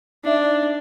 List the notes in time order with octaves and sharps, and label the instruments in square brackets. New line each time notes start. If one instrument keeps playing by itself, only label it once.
[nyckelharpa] D4 [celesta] D#4 E5